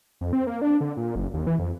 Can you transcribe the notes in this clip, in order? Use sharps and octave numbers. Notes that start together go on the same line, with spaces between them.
F2
C4
A#3
D4
D3
A#2
F#1
D#2
E3
F2